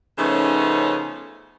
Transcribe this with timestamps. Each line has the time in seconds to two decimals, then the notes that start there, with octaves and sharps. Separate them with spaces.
0.18 C#3 F3 A3 B3 C#4 D#4